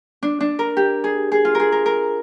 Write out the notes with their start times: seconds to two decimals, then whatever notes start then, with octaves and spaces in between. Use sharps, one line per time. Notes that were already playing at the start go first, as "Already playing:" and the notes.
0.23 D4
0.40 D4
0.59 A#4
0.77 G4
1.04 G#4
1.32 G#4
1.45 F4
1.55 G#4 A#4
1.72 A#4
1.86 A#4